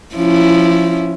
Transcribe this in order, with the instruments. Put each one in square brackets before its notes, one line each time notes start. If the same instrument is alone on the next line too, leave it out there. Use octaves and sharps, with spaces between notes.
[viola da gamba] F3 C#4 E4